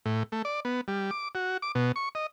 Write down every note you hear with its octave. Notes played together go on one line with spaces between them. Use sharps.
A2
A3
D5
B3
G3
D6
F#4
D6
B2
C#6
D#5